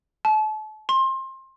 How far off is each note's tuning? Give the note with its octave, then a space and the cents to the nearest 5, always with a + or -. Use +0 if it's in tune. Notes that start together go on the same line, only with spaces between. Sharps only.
A5 -35
C6 +25